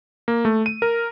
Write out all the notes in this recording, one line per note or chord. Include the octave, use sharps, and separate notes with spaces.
A#3
A3
D#7
A#4